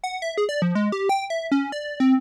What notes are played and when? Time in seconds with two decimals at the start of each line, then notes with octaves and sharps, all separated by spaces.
0.04 F#5
0.22 E5
0.38 G#4
0.49 D5
0.62 F3
0.75 G#3
0.92 G4
1.09 G5
1.30 E5
1.52 C#4
1.72 D5
2.00 C4